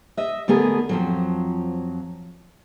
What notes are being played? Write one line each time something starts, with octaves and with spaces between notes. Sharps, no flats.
D#5 E5
D3 A3 B3 G#4 A#4
F2 F3 F#3